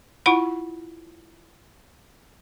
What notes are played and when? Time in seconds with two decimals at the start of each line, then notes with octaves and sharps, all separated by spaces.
0.26 E4 F4 F#5 B5